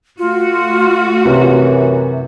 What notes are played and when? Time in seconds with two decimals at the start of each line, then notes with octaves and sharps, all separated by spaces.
0.18 A3 F4 F#4
1.25 F#2 C3 E3